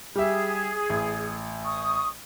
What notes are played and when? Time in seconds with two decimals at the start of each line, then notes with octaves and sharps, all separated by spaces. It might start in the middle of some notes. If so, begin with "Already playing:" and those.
0.15 G3 G4 G#4 E5
0.90 A1
1.65 C#6 D#6